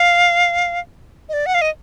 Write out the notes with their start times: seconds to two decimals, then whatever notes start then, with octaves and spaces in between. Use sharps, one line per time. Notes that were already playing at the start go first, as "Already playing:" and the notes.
Already playing: F5
1.29 D#5
1.33 D5
1.46 F#5
1.54 F5
1.61 D#5